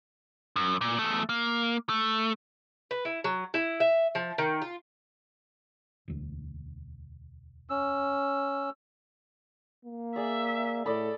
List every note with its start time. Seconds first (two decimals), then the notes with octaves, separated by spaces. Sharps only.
0.56 F#2
0.81 A#2
0.98 E2 A3
1.29 A#3
1.89 A3
2.91 B4
3.05 E4
3.24 F#3
3.54 E4
3.80 E5
4.15 F3
4.38 D#3
4.62 F4
6.08 E1 D2
7.70 C#4 E6
9.85 A#3
10.16 G#4 D5 E5
10.86 A2 A4 D5 D#5 B5